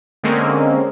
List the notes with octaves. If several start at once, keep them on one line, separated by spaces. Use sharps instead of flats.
D3 G#3 A#3 C4 C#4